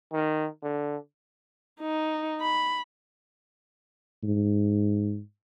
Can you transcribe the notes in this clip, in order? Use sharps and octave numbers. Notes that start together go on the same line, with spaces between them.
D#3
D3
D#4
B5
G#2